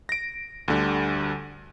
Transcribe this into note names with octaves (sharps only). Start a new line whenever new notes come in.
A#6 D7
D2 D3 G3